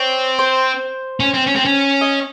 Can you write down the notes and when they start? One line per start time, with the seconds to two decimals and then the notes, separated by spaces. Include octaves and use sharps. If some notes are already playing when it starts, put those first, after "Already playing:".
Already playing: C4 C#5
0.39 C5
1.20 C#4
1.34 C4
1.46 C#4
1.55 C4
1.65 C#4
2.01 D#5